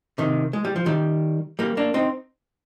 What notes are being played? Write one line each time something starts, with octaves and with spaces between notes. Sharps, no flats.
C3 D#3
G#3
G3
F3
D#3 G3
G3 A#3
A#3 D4
C4 D#4